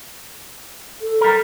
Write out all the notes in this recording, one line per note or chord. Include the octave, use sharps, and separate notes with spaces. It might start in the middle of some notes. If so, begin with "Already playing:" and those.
A4
G3 A#4